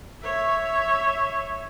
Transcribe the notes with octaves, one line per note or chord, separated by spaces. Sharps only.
C#5 E5